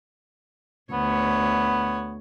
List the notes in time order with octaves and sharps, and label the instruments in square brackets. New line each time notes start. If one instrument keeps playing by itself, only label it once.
[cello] D2 C#5 [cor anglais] B3